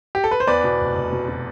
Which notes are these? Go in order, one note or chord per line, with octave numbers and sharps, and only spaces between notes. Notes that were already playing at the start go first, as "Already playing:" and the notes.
G4
A4
B4
C5
E2 B4 D5
B2
F1
F1
B2
B2